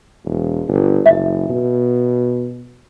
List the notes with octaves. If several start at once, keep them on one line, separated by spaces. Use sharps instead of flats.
E1
G1
F#1 E5
B2